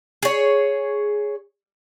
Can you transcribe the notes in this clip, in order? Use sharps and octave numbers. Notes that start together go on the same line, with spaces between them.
G#4 C#5